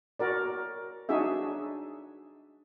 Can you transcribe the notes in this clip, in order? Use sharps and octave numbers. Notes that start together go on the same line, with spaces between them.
F#4 A#4 D5
D4 D#4 F#4 G#4 E5